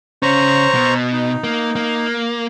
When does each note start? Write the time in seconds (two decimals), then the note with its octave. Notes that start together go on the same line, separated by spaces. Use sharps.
0.23 C#3 C#4 C5 A#5 C#6
0.74 B2
1.13 D#4
1.44 A#3
1.76 A#3